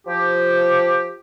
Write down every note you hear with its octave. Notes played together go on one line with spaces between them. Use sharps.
F3 G4